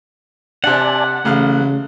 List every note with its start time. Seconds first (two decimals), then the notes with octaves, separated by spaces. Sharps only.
0.64 C3 D4 D5 F#5 G#5 A5
1.25 A1 C#3 A3 F5 F6